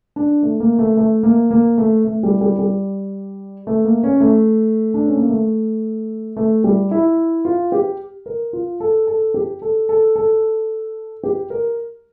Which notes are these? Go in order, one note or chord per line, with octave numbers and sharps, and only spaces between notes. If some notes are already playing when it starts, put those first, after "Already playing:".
D4
A3
A#3
A3
A3
A#3
A#3
A3
A3
G3
G3
G3
A3
A#3
C#4
A3
D4
C#4
A#3
A3
A3
G3
E4
F4
G4
A#4
F4
A4
A4
G4
A4
A4
A4
G4
A#4